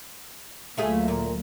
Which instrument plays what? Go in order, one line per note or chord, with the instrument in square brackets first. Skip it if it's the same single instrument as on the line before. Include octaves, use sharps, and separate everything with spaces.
[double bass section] D2 F#3 A#3 [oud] A3 F4 G#4
[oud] A#2